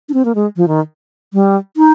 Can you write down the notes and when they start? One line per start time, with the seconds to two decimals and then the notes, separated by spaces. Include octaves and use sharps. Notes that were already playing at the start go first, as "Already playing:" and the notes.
0.09 D4
0.14 C4
0.25 A#3
0.35 G#3
0.57 F3
0.68 D#3
1.33 G3
1.77 D#4